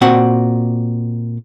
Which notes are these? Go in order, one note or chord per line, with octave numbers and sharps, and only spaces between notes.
A#2 C4 F#4 F#5